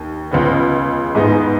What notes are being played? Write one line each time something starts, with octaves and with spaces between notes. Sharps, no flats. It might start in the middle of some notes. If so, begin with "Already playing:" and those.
Already playing: D#2
C#2 C#3 B3
G#2 G#3 B3 D#4